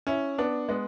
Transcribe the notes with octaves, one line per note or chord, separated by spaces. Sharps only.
C#4 E4
B3 D4
G#3 B3